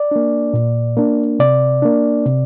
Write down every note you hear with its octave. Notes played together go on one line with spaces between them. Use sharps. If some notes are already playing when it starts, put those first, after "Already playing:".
Already playing: D5
A#3 D4
A#2
A#3 D4
C3 D5
A#3 D4
C3